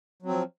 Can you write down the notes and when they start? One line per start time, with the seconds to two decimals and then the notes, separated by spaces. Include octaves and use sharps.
0.22 F#3
0.26 C4
0.29 F3